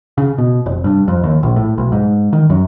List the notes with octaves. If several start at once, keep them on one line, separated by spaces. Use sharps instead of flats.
C#3
B2
F1
G2
F2
D#2
A#1
A2
B1
G#2
D#3
F#2